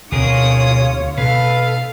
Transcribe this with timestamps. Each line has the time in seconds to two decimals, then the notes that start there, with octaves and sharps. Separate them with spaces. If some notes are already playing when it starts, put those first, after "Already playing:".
0.12 D2 B2 C4 F4 G#4 A#4 C#5 D#6
1.18 B2 A4 B4 F5